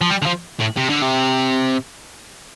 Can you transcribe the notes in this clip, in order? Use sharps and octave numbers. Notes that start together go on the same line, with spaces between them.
F3
G3
D3
F3
A2
C3
D3
C3